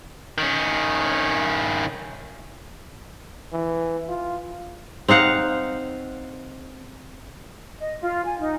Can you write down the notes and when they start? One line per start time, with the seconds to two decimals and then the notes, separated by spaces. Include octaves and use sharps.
0.38 D#3 C#4
3.53 E3
4.09 F4
5.08 C4 D#4 F5 F#5
7.79 D#5
8.01 F4
8.25 G#5
8.39 D#4